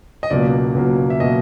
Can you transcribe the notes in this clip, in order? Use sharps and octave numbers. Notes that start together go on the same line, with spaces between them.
D#5
C#2 B2 F#3 A#3 D5
C#2 B2 F#3 A#3
E5
B2 F#3 A#3 D#5